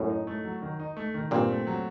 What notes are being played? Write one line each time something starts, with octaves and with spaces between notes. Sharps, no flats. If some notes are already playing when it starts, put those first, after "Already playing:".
Already playing: F#2 A2
D#4
A3
F#3
D#3
D#4
A3
D#3
G2 A#2 C4
A3
F#3